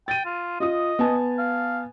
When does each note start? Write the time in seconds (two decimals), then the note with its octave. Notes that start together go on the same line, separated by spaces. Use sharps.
0.08 G5 A6 D#7
0.25 F4
0.60 F4 D#5 D#6
0.99 B3 G#5 A5
1.38 F5